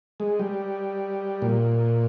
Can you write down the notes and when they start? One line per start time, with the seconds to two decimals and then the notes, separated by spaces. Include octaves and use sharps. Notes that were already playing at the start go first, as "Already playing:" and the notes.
0.20 G#3
0.40 G3
1.42 A#2